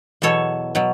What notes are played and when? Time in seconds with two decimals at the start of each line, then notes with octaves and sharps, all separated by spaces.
0.22 E2 B2 F#3 A4 C#5
0.75 B2 F#3